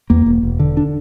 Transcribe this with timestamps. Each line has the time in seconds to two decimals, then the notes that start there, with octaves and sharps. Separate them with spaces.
0.10 E2 A#3
0.26 E1
0.43 E1
0.60 D3
0.77 D4